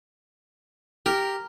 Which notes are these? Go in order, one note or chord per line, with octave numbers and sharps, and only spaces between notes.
G4 A#4